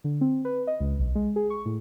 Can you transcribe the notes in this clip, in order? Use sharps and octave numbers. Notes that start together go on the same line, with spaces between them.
D3
C4
B4
D#5
C#2
B1
G#3
G#4
C#6
A2